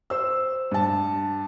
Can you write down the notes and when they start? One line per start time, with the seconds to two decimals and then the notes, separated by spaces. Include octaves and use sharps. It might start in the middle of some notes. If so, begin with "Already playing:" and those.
0.10 C5 E6
0.72 G2 A5